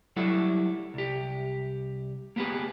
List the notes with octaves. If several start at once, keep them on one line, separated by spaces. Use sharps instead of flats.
F#3 G3 E4 A4 F#5
C2 G4
A#3 B3 G4 G#4 B4